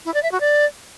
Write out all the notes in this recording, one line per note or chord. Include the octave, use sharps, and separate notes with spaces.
E4
D5
E5
F#4
D5